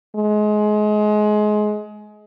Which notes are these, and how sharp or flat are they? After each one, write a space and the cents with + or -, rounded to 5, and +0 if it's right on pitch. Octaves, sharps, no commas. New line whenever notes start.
G#3 +25